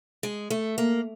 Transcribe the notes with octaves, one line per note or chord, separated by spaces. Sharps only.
G#3
A3
A#3